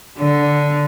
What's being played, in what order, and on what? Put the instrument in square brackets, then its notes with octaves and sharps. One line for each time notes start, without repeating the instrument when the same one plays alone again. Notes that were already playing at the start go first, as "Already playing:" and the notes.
[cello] D3